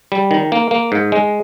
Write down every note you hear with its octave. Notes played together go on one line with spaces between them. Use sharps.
G3
D#3
A#3
A#3
G#2
G#3